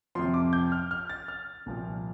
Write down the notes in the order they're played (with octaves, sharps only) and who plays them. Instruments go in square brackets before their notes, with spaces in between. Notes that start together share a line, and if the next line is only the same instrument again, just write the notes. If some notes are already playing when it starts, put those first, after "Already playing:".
[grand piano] F2 C3 F3 C6
D6
G6
F6
F6
A6
F6
C2 A#2 F3